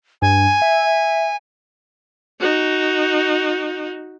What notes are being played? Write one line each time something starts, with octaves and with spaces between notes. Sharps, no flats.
G2 G#5
E5
D#4 F#4